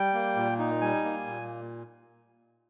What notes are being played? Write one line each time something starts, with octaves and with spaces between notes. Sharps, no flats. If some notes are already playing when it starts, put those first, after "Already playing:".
Already playing: G3 G5
A#3
A#2
D#4
G3 G#5
A#3
A#2